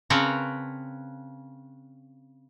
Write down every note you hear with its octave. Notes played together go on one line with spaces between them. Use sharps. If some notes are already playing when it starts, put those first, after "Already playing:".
C#3 C4 A#4 B4 C#5 A5